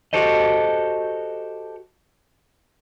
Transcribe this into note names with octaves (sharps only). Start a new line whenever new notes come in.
F#4 G4 A4 C5 D#5